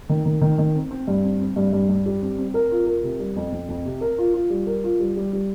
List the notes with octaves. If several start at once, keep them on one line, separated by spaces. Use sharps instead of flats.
D#3
D#3
D#3
D#3
C4
C4
G2
C4
C4
G2
G2
G2
G3
C4
C4
A#4
F4
A#4
C3
G3
F2
F2
F2
C3
A#4
F4
F4
G3
A#4
F4
G3
G3
G3